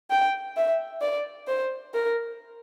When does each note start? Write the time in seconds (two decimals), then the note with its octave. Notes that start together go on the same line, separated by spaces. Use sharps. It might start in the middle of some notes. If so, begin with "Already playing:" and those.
0.11 G5
0.57 E5
1.01 D5
1.47 C5
1.94 A#4